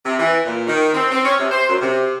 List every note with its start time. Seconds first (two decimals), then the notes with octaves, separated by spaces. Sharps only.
0.05 C3
0.19 E3
0.45 A#2
0.67 D#3
0.93 C4
1.11 C4
1.25 C#4
1.39 C3
1.51 C5
1.68 F#2
1.81 C3